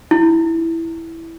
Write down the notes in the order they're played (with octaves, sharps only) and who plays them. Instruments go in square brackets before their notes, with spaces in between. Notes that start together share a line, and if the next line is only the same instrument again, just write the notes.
[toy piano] E4